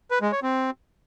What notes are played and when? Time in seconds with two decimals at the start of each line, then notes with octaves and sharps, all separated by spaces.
0.11 B4
0.21 G#3
0.32 C#5
0.43 C4